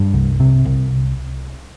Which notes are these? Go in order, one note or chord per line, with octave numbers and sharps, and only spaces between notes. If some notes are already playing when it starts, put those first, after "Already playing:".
Already playing: G2
C2
C3
C2